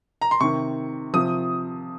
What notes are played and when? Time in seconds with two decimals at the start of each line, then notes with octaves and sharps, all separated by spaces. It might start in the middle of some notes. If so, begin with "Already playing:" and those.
0.21 A#5
0.31 C6
0.41 C3 D#3 C#6
1.14 C3 F3 D#6